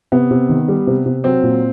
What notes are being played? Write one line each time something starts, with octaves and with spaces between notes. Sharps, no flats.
C3 B3
C3
D#3
G3
C3
C3
F#3 C4
A#2